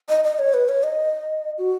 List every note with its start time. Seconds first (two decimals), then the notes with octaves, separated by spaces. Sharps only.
0.09 D#5
0.24 D#5
0.39 C#5
0.54 B4
0.69 C#5
0.83 D#5
1.58 F#4